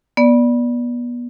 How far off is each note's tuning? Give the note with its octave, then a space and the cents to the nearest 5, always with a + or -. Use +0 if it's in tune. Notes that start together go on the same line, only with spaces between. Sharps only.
B3 -30 D5 +0